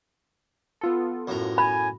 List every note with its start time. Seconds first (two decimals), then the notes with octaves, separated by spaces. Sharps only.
0.81 B3 F4 A4
1.28 F#2 A2 A#5
1.58 G#5 B5